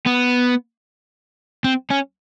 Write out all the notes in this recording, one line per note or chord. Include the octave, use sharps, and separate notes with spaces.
B3
C4
C#4